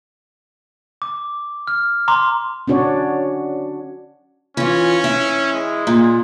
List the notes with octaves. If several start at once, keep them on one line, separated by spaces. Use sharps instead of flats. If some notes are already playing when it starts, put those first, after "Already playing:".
D6
F6
A#5 C6 D6
C#4 D4 F#4 C#5 D5
E3 C#4 F4
E4
G#3
A#2